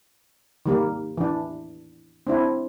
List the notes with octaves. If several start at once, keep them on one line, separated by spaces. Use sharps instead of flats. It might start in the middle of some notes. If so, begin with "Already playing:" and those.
D#3 G3 A#3
E3 D4
C4 D4 E4